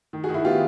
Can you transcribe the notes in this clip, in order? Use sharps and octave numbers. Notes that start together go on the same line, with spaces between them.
D#3
F#4 G#4
D#3
E4 F#4
B3 F4 G4